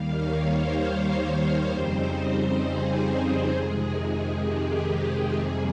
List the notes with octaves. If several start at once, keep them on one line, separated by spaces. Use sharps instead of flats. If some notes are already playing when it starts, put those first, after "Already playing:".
Already playing: D#2 D#3 G3 A#3 F5
C#5
C5
F2 C#3 G3 C4 D#4
G#4
F2 C3 D#3 G#3
G4
F2 C3 D#3 G3 A#3 G#4